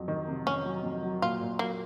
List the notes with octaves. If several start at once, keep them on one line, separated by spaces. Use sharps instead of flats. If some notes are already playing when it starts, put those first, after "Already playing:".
Already playing: F2 F#3
D#3
C3
F2 C#4
F#3
F2
F#3
A#2 F4
A#2
F#3 A#3